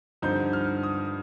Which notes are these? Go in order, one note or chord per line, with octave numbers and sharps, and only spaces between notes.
G2 D3 F3 C4 D#4 G6
F6
D#6